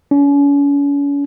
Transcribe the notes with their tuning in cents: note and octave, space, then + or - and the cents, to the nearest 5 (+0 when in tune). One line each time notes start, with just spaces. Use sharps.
C#4 +40